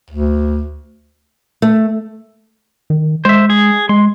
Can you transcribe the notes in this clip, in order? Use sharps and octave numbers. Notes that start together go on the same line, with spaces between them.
D2
A3
D#3
G#3 C5 E5
G#4
G#3 C6